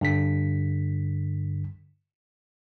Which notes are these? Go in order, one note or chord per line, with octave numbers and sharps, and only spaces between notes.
G2 D3 B6